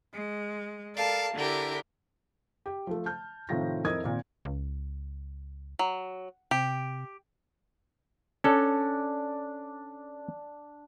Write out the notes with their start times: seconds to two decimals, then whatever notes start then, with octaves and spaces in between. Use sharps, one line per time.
0.14 G#3
0.97 A4 A#4 D5 F5 A5
1.34 D3 D4 E4 G4 A#4
2.66 G4
2.87 F3 A3
3.06 A5 F6 G6
3.49 A2 C3 D#3 F3 F4 A#6
3.85 F2 E4 A#4 D#5 D#6 G#6
4.04 G#1 A#2
4.45 C#2
5.79 F#3
6.51 C3 G4
8.44 C#4 D4 A4